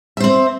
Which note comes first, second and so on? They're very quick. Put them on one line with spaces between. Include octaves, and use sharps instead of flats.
E5 C5 C4